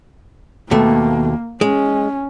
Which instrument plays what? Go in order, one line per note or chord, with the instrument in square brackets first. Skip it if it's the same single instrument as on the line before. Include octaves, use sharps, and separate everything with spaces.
[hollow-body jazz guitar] D#2 B2 A3 [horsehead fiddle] A#3
[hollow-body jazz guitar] G#3 [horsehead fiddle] C#4